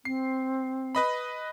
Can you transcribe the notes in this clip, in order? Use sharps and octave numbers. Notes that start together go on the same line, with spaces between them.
C4 C7
B4 D#5 B5